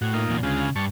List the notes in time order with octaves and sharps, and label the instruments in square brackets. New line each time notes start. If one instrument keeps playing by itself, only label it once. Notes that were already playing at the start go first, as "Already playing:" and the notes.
[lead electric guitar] A2 [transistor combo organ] F#4
[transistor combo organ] A#3 D#4 F4
[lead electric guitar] E2 A#2
[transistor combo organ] D2 G#3 F4 [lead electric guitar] C#3
[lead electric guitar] G2 [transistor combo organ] A5 C#6